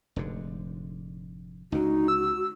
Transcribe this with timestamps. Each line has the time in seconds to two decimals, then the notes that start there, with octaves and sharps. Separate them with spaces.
0.16 F1 G#2 D3
1.72 C#2 D3 D#4 F#4
2.08 E6